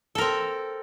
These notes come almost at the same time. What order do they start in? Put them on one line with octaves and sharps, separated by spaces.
A4 A#4 C4